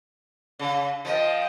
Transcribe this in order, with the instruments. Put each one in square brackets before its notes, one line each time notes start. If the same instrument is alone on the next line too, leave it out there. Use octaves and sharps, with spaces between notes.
[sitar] C#3
[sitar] F3 [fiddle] D#5 G5